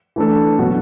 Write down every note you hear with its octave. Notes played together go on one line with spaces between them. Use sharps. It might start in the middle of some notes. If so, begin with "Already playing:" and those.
E3 A3 D4 A4
B2 F#3 D4 F#4